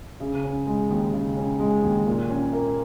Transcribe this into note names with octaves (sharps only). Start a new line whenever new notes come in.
C#3
C#4
G#3
D#2
C#3
C#4
G#3
D#2
A#2
C#4
A#3